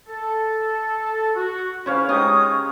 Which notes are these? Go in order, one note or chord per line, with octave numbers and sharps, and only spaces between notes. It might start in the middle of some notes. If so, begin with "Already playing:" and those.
A4
F#4
C#3 C#4 E4 B4 C#5 F5
G#3 C#4 D#4 G4 A#5 D#6